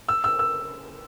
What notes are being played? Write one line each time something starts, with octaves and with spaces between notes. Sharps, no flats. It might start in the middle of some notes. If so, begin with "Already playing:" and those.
E6
E6
E6